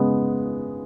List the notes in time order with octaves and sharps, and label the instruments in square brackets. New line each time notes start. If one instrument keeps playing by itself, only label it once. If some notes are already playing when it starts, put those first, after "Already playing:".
Already playing: [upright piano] C#3 G#3 B3